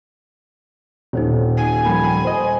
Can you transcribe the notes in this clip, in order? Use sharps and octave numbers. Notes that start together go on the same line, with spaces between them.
D#1 D#4 C5 C#5
G#5
F3 G3 A#3 G5 B5
C5 D#5